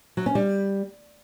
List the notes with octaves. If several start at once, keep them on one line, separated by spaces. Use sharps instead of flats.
F#3
C#4
G3